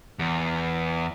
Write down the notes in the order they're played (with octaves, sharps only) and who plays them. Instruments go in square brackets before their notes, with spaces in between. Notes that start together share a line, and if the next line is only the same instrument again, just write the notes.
[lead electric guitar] E2